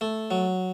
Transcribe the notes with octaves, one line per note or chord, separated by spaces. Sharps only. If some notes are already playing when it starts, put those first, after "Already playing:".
A3
F#3